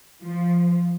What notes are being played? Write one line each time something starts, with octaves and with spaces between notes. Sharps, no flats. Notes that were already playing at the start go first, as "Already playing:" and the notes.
F3